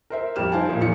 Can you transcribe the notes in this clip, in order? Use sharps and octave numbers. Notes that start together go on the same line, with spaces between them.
A#4 C5 E5
F2 G3 G4 F6 E7
D#4 E4 C5 F5 G#5 A5
A#2 F3
E2 F3 C#7